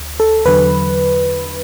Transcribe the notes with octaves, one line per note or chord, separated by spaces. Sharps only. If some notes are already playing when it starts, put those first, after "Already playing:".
Already playing: D2
A4
E2 D3 F#3 B4